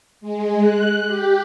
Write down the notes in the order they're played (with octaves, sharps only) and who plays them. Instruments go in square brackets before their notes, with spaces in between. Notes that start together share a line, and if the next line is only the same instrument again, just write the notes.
[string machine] G#3
F#6
G4